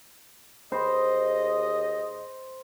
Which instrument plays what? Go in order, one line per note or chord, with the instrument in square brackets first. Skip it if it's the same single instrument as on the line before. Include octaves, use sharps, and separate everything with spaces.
[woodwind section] D#2 G#4 D#5 [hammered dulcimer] C5